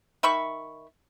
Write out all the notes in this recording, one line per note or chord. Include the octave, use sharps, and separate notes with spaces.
D#3 E5 B5 C#6